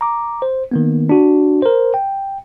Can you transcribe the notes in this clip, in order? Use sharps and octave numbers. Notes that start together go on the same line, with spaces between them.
A#5 D6
C5
D#3 A#3 B3
D4 F#4
A#4 C5
G5